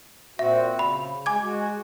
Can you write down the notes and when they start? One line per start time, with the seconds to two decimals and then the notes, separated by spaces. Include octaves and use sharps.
0.39 A#2 C4 F#4 E5
0.79 C#3 B5
1.26 G#3 G#5 D6 G#6
1.43 G#3 F#4